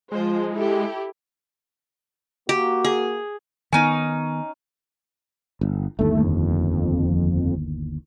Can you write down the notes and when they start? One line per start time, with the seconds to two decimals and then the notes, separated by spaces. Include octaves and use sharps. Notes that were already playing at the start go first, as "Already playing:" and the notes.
0.12 F3 G#3 F4 C5
0.56 E4 G4 A4
2.49 A#3 F#4 G4
2.85 G#4
3.73 D#3 B3 C#4 D#4 G#5
5.61 G1
5.99 G1 D#2 A3
6.24 F2